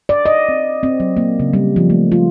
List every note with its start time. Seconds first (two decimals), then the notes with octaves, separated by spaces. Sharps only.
0.09 D5
0.26 D#5
0.49 C4
0.83 C4
1.00 F#3
1.17 A#3
1.40 C#3
1.53 G3
1.76 F3
1.90 A3
2.12 F4